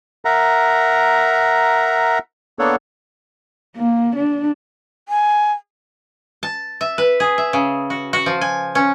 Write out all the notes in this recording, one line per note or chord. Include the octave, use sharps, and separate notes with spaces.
A#4 E5 F#5 A#5
A#3 B3 D4 A4 C#5 F#5
A#3
D4
G#5
A5
E5
B4
G#4
E5
C#3
F#4
F#4
F3
G#5
C#4